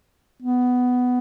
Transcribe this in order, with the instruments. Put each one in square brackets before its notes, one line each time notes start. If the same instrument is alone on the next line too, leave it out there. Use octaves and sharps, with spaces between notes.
[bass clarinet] B3